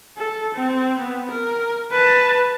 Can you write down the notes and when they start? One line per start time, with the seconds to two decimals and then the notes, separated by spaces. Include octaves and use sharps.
0.17 A4
0.54 C4
0.98 B3
1.31 A#4
1.92 B4 A5